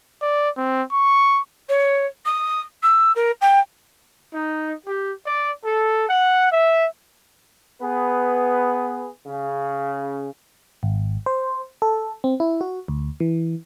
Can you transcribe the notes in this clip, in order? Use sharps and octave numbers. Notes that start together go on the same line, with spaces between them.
D5
C4
C#6
C#5
D#6
E6
A#4
G5
D#4
G4
D5
A4
F#5
E5
B3 G#4 B4
C#3
G#1
C5
A4
C4
E4
F#4
D2
E3